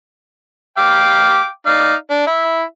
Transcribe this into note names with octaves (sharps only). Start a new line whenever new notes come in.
F5 G5 D6
D#4 D5 F5
D4
E4 E5